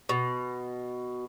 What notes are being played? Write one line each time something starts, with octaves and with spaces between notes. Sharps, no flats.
B2